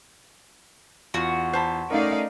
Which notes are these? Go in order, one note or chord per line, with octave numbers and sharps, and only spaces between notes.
E2 F4 F#4 C#7
C5 A5 B5
A3 C#4 D#4 A#4 D5 F5